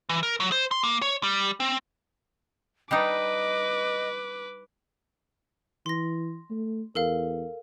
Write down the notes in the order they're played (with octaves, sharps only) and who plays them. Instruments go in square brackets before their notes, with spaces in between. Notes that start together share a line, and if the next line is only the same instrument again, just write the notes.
[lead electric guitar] E3
A#4
F#3
C5
C6
A#3
C#5
G3
C4
[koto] G3 D4 D#4 [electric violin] B4 D6 [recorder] D#5
[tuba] E3 [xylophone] C6 A#6
[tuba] A3
[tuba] E2 [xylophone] A4 A#4 F5